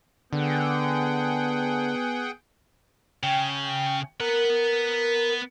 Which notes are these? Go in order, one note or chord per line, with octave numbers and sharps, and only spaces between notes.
D3 B3 G#4 F#5 G5
C#3 G5
B3 A#4 F#5